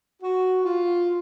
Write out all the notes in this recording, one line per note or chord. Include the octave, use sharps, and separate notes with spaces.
F#4
F4